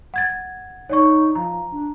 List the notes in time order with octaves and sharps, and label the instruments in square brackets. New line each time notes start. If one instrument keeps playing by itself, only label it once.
[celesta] F#5 G#6 A6
[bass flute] D#4 [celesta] C#5 D5 C#6
[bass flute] F3 [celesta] A#5
[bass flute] D4